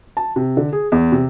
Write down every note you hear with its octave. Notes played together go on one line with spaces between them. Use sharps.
A5
C3
D3
G#4
E2
C3